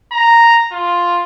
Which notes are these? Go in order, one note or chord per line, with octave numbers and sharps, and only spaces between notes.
A#5
F4